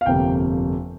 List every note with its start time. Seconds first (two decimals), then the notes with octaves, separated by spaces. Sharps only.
0.01 F5
0.06 G1 F2 C3 G3 A#3 G5